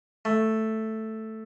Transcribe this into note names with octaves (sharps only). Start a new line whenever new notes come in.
A3